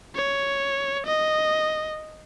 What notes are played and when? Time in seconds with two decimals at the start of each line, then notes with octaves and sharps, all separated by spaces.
0.15 C#5
1.06 D#5